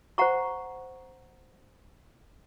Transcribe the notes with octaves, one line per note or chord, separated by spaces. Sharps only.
C5 F#5 A#5 C#6